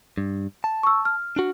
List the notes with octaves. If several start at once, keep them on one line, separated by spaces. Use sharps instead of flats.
G2
A5
C#6 E6
F6
D4 F#4